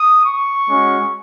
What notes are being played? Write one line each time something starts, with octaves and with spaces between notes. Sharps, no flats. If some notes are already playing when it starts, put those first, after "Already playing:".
Already playing: D#6
C#6
G#3 C#4 F#4